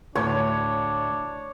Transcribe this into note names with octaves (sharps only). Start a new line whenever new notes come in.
D2 A2 D4 C#5